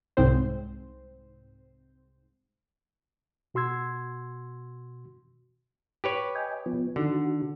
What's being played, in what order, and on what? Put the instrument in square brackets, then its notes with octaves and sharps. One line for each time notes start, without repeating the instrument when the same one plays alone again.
[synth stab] C2 G#2 C4 C5
[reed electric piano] B2 F#4 C6 E6 G#6
[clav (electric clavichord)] G4 B4 C#5
[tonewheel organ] D#5 G5 G#5
F3 B3
[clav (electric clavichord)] D3 [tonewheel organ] D#3 F#4